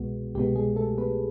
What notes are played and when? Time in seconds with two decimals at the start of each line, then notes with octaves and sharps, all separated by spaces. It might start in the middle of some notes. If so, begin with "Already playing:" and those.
Already playing: C2 B2 G#3 B3 F#4
0.35 C2 B2 G#3 B3 G4
0.55 G#3 G#4
0.76 A3 A4
0.98 B3 B4